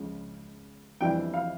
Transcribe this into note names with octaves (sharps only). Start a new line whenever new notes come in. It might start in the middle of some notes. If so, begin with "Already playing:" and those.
Already playing: C#2 C#3 F3
F2 E3 G3 D4 G5
F5